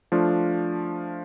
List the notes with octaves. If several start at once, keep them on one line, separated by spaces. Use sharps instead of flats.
F3 A3 D4 F4